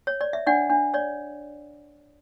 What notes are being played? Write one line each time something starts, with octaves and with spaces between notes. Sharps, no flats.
C#5
D5
E5
D4 D5 F#5
D4
C#5 D5